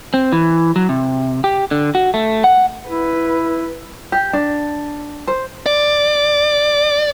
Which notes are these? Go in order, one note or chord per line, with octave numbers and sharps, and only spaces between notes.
C4
E3
F#3
C3
G4
D3
F#4
A3
F#5
E4 B4
G4
D4
C5
D5